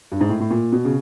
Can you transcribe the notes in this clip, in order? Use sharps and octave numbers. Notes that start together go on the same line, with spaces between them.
G2
G#2
A2
A2
A#2
B2
C#3